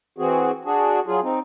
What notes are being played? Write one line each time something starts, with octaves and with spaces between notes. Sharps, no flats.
E3 C4 F#4 G#4
D4 F#4 G#4
F#3 F4 G#4
C4 D#4